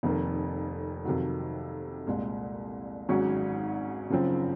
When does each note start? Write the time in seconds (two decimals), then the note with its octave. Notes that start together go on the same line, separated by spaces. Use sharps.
0.03 F1 F2 D#3 A#3
1.05 F2 C3 D#3 F#3
2.07 C2 A#2 G#3
3.09 G#1 G#2 F#3 C#4 F#4
4.10 F#1 F#2 F3 C4